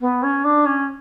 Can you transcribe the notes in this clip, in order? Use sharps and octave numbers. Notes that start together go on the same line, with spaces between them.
B3
C#4
D4
C#4